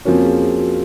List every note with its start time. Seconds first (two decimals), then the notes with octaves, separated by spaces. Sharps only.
0.05 F2 F3 A#3 C#4 F#4
0.23 G#4
0.41 G#4
0.59 F#4